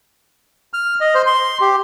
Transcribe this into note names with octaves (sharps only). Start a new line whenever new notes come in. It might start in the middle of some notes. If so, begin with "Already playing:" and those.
F6
D#5
C5
C6
G4